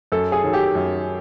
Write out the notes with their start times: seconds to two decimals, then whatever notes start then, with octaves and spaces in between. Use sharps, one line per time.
0.12 F#2 A4
0.32 G#4
0.43 D#3 F#3
0.53 G4
0.75 F#2